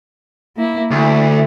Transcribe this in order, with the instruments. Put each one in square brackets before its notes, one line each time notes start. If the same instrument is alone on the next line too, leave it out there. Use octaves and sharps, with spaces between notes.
[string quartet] A#3 E4
[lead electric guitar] D2 [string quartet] E4